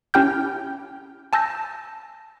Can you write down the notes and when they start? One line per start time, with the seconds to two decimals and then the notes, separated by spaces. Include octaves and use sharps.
0.14 C#4 E4 G4 G5 F6 G6
1.33 G#5 A5 E6 G6 A#6